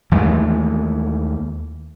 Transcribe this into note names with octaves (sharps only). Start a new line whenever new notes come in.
D#2 E3 G#3 A3